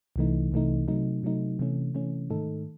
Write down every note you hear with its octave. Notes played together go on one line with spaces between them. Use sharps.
C2 C3 E3 A3 D#4
C2 C3 E3 A3 D#4
C3 F#3 A3 D#4
C3 F#3 A3 D#4
C3 E3 A3 C#4
C3 E3 A3 C#4
G#2 D#3 A3 D#4 A4